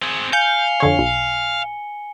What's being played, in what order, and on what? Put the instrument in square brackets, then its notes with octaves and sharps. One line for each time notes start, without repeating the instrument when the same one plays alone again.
[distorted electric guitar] C4 G#4
[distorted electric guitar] F5 [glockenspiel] G#5 C#7 G7 [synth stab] G6
[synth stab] F2 D3 C#5
B1